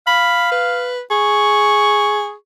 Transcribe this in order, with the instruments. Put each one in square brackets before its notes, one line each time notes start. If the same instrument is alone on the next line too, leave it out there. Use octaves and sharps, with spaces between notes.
[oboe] F5 [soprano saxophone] B5
[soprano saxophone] B4
[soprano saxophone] G#4 [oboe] C#6